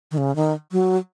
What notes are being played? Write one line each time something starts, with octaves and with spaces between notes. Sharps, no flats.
D#3
C#3
D#3
F#3